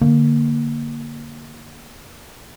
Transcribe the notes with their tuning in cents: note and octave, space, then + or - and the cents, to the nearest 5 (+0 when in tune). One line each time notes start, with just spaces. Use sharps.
D3 +0 A#3 +0